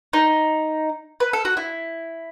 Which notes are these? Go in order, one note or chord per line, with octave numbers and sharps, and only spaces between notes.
D#4
B4
A4
F#4
E4